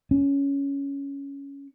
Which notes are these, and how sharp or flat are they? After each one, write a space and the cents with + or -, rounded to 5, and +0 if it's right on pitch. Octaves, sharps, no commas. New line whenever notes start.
C#4 +10